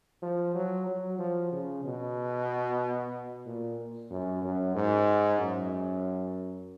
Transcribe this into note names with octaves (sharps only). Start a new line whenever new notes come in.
F3
F#3
F#3
F3
C#3
B2
A#2
F#2
F#2
G#2
F#2